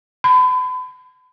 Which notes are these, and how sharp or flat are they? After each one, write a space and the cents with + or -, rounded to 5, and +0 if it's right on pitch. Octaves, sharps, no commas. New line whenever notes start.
B5 +40